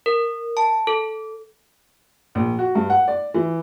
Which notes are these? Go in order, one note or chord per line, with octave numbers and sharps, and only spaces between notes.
A#4
A5
A4
A#1
F#4
G2
F#5
D5
E3